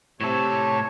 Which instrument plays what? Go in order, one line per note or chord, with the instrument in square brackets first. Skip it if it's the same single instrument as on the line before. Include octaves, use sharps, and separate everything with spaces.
[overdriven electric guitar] A2 A4 [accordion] C3 C#5